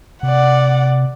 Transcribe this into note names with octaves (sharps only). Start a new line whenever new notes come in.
C3 D5 F#5